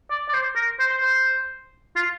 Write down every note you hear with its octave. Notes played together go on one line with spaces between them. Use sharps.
D5
D5
C5
A#4
C5
C5
C5
F4